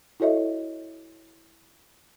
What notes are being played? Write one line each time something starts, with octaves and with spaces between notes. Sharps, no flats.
E4 F#4 A4 C#5 D#5 E5